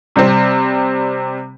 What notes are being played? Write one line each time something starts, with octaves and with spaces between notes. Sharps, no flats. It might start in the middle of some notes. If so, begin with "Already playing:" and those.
C3 G3 C4